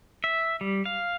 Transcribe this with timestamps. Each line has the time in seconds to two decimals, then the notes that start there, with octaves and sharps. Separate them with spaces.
0.24 E5
0.61 G3
0.85 F5